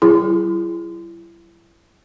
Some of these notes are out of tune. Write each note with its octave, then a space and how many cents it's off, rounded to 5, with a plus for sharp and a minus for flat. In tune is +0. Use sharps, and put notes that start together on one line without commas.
F#3 +40 E4 +35 G#4 +0